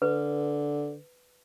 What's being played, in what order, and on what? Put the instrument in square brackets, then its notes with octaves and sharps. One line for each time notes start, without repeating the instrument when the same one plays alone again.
[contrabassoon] D3 [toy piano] B4